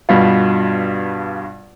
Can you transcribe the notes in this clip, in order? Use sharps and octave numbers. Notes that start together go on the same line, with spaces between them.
G2 B2 F4